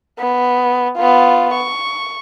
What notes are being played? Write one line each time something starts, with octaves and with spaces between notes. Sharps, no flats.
B3
B3 F4
C#6